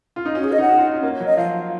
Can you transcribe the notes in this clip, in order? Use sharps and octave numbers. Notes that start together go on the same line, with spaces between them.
F4
D#4
C#4 F#4
G#4
D#5
D#4 F#5
F#4
F4
D#4
C#4
A#3
C#5
F#3
D#5
F3 F5